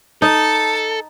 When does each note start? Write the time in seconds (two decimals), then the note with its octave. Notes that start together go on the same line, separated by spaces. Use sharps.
0.22 D#4 A4 A5